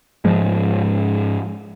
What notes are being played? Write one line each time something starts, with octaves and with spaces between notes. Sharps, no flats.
G#2 F3 G#3